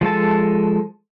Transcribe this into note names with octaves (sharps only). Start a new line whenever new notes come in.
F3 G#3 A4 A5